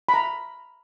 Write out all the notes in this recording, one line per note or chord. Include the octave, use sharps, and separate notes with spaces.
B5
A#5